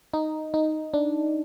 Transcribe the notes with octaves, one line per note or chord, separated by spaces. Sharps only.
D#4
D#4
D4